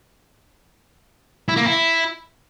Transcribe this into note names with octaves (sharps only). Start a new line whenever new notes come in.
E4
A#3
E4